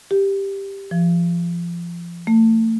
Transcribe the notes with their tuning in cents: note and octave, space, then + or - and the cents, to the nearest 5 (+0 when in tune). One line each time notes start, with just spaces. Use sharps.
G4 +5
F3 -25
A3 +35